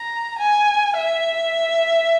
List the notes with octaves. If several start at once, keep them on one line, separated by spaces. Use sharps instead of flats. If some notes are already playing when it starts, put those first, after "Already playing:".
Already playing: A#5
G#5
E5